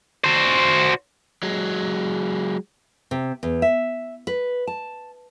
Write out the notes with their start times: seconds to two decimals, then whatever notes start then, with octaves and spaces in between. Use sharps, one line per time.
0.24 F#4 C5
1.43 F#3 G#3
3.11 C3
3.43 E2
3.62 E5
4.27 B4
4.67 A5